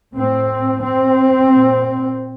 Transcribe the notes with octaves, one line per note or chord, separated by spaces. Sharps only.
A2 C4
C4
A#2